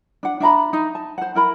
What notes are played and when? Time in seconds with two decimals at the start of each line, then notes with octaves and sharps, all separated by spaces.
0.23 D4 F#5
0.40 D4 E5 A#5 B5
0.73 D#4
0.95 A5
1.18 C5 F#5
1.35 E4 A#4 B5